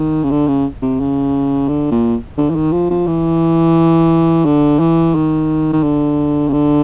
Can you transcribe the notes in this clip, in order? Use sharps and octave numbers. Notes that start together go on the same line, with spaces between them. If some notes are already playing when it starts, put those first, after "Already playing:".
Already playing: D#3
C#3
D3
C#3
C3
C#3
D3
A#2
D3
E3
D#3
F3
F3
E3
D3
E3
D#3
D#3
D3
C#3
D3